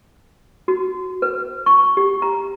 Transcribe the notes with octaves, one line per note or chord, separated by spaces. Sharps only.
F#4
B4
C#6
G4
A#5